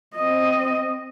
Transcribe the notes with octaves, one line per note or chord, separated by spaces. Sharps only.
C4 D#5